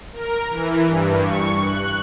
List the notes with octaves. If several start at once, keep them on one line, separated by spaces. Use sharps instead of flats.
A#4
E3
G2
C#6
F#6